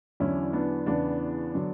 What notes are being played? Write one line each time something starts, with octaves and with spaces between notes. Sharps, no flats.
E2 D3 F#3 C#4 E4
B3 D4
E2 C#3 E3 B3 D4
D3 F#3